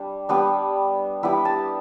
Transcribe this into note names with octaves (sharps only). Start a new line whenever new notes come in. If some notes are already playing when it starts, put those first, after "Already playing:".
Already playing: G3 D4
G3 B3 D4
G3 B3 E4 B5
A5